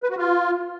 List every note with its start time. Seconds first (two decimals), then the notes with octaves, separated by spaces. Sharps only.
0.03 B4
0.10 F#4
0.17 F4